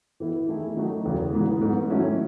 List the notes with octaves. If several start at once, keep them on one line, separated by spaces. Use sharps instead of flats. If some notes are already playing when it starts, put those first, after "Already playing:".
E3 B3 E4
D#3 A3 E4 G#4
D#3 F#3 A3 D#4 F#4
E2 C#3 F#3 B3
G#2 E3 B3
G#2 F#3 B3 F#4
D#3 F#3 A3 C#4 E4